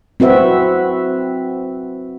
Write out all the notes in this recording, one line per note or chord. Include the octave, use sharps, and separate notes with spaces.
C4 F#4 B4 E5